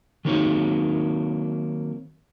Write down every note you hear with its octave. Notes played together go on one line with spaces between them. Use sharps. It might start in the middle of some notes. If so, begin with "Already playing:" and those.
D#3 F#3 A#3 C4 D#4 C#5